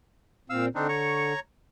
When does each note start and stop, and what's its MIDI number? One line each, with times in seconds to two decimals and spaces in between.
0.50 0.68 46
0.50 0.68 60
0.50 0.66 77
0.50 0.66 88
0.75 1.33 50
0.75 0.87 60
0.75 0.87 62
0.75 0.87 63
0.89 1.40 73
0.89 1.40 82
0.89 1.40 85